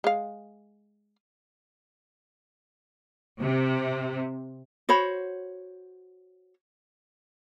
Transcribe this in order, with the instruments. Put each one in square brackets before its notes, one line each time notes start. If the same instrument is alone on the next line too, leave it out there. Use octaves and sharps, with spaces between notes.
[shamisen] G#3 F5
[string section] C3
[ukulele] F#4 C5 C#5 B5